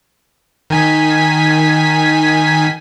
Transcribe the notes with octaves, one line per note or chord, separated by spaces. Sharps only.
D#3 G#5 B6